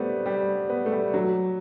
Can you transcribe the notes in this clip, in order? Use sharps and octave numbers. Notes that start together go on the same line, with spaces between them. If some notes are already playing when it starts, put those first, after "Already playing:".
Already playing: G3 A3 B3 C4
G3
B3
A3
G3
F#3